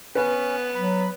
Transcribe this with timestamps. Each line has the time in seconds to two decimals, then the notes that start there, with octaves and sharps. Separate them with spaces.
0.15 B3 C#4 B4
0.75 F#3 B5